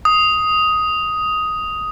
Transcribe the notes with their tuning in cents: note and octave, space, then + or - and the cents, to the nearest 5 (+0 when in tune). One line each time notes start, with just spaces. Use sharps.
D#6 +10